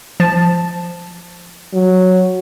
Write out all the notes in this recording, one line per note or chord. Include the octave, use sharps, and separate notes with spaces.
F3 A5 A6
F#3